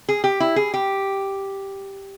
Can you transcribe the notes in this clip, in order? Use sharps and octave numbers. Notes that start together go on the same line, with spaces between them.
G#4
G4
E4
G#4
G4